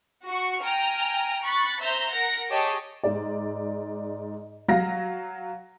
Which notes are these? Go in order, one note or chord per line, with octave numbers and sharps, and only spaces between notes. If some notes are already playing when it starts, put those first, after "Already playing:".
F#4 C#6
G5 G#5 A#5 F6
B5 C#6 F#6 A6
C5 E5 A#5 G6
A#4 F#5 A#6
G4 G#4 C#5 D#5 G5 A5
G#2 D5
F#3 F5 A#6